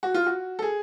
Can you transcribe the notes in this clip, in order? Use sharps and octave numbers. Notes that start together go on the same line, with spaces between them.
F#4
F4
F#4
A4
G#4